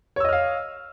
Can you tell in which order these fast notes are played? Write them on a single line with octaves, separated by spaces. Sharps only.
C#5 E6 D#5 F6 F5